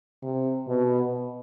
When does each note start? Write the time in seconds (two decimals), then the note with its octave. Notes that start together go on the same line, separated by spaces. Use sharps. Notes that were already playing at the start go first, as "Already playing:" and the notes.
0.23 C3
0.68 B2